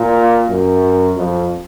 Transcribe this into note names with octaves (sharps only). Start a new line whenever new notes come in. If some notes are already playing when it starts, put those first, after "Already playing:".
Already playing: A#2
F#2
F2